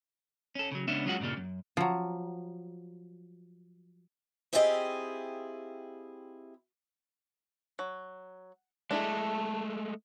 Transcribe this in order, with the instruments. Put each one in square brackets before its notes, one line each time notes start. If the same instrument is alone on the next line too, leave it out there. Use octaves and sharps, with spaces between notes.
[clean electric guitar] C#4 A4
C#3 F#3
C#2 B3 C#4 D4 E5
F#3 G#3 C#4 F4 F#4 F#5
G2 A#2 C#3 G3 A#3
F#2
[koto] F3 F#3
[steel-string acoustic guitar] C4 E4 F4 G4 G#4 D#5
[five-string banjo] F#3
[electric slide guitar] G#3 A3 [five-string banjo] D4 E4 G#4 [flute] A5